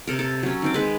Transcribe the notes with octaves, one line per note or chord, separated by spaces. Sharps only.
C3 A4 A#4
A4
F#3 C#4
D#3 C4 D6
G#3 B4